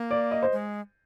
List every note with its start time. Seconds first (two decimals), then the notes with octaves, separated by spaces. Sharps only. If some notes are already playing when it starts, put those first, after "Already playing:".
Already playing: A#3
0.11 D5
0.31 D#5
0.43 C5
0.52 G#3